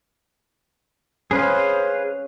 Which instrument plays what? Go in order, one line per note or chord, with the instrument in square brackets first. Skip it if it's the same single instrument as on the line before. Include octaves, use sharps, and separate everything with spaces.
[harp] C#4 [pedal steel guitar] G#4 B4 F5 [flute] C5